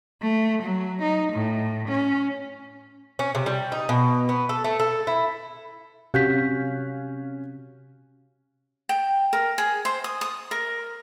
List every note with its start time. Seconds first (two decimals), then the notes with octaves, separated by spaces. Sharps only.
0.22 A3
0.63 F#3
1.02 D#4
1.33 A2
1.89 C#4
3.19 C#4
3.35 C3
3.46 G3
3.72 D#4
3.89 B2
4.29 B3
4.49 A4
4.64 A3
4.80 A4
5.07 E4
6.14 C3 C#4 F#4 G4 F5 F#6 G6 B6
8.89 G5
9.33 A#4
9.58 G#4
9.85 C5
10.04 D#6
10.21 D#6
10.51 A#4